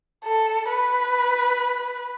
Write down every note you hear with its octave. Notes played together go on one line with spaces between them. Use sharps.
A4
B4